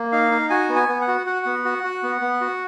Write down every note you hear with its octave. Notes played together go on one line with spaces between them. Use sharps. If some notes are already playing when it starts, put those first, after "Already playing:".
Already playing: A#3
D#4 F5
D#4
F#4 G#5
B3
G#5
B3
F#5
F#4
F#4 F#5
B3
F#4
F#4
B3
B3
F#4